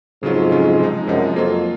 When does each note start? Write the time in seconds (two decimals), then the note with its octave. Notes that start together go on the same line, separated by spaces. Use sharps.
0.22 F2 G#2 C#3 F#3 C#4 F4
0.51 C#3 F#3 C#4 F4
0.79 C3 F3 G#3 D#4
1.07 F#2 C3 F3 G#3 D#4
1.35 F2 F#3 A#3 F4